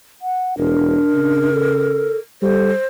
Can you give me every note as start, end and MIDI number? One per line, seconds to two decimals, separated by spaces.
0.22 0.58 78
0.58 0.98 28
0.58 1.49 62
0.58 2.16 70
1.14 2.13 49
1.53 2.18 69
2.42 2.72 55
2.42 2.72 69
2.42 2.87 72